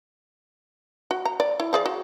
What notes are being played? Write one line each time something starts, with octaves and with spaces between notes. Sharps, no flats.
F#4
A#5
D5
E4
F3 G#4 D5
F#4